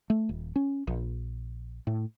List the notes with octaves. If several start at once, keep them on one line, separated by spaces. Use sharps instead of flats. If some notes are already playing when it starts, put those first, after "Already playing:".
A3
D#1
C#4
A#1
A2